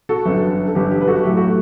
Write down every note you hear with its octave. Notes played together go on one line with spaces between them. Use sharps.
F#4 A4
G1 F#2 D3
A4
G1 F#2 D3 G4
G4
B4
F#4 A4
B1 A2 F#3 A3 G4
F#4 A4